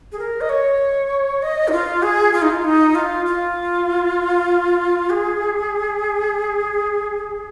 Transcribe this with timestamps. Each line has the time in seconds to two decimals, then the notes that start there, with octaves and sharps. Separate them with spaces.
0.12 G#4
0.19 A#4
0.41 D#5
0.49 C#5
1.42 D#5
1.68 D#4
1.72 F4
2.02 G#4
2.33 F4
2.42 D#4
2.50 F4
2.64 D#4
2.95 F4
3.26 F4
5.10 G#4